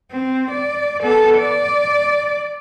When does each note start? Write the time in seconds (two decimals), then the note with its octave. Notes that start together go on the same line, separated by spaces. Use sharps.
0.12 C4
0.51 D5
1.02 B3 A4
1.38 D5